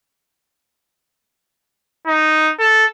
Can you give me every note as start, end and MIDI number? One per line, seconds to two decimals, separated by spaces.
2.07 2.52 63
2.59 2.85 69